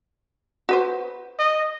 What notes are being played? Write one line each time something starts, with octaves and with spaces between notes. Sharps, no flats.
F#4 B4 C5
D#5